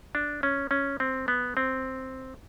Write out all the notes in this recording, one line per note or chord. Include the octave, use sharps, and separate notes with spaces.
D4
C#4
C#4
C4
B3
C4